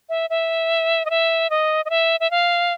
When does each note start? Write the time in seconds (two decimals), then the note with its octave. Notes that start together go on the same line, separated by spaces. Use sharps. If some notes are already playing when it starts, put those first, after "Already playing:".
0.09 E5
0.30 E5
1.05 D#5
1.10 E5
1.50 D#5
1.85 D#5
1.90 E5
2.20 E5
2.31 F5